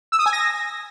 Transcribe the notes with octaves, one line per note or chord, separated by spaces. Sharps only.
E6
D#6
G#5
A#6